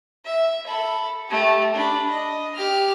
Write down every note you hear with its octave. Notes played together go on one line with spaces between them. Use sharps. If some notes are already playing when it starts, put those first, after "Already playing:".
E5
A4 B5
A3 G4
D4 B5
D#5
G4 F6